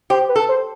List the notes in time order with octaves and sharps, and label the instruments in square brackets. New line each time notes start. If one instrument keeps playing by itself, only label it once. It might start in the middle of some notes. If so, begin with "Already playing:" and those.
[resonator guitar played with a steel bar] G4 [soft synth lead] C5
[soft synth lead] B4
[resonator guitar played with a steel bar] A4
[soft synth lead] C5